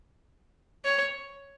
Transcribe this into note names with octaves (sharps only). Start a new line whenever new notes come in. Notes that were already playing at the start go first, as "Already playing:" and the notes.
C#5